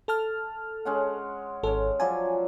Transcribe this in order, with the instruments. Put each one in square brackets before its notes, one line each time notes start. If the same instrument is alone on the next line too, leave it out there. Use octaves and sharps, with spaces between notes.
[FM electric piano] A4 A5 F6
[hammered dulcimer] G#3 C#4 F#5
[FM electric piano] G#1 A4 [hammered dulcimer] G#3 C#4
[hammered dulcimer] F3 F#3 D5 [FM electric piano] G#5